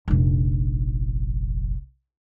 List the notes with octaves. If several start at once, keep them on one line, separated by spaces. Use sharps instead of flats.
F1 A#1